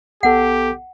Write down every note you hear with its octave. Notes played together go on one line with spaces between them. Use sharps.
A#1 B3 G4 A4 F#5